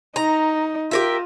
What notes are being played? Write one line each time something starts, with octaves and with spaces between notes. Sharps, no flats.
D#4 A#5
F4 G4 A#4 E5